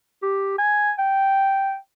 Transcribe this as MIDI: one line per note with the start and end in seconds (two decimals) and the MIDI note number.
0.22 0.53 67
0.58 0.91 80
0.98 1.76 79